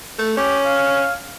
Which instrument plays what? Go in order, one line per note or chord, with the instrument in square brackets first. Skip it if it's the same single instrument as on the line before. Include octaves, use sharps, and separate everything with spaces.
[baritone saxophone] A3
[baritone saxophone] C#4 [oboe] G4
[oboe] F5